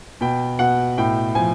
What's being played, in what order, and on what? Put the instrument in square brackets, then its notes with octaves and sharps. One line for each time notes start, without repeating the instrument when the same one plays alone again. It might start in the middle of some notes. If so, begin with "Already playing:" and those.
[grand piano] B2 G5
B2 F#5
A2 G5
F3 G#5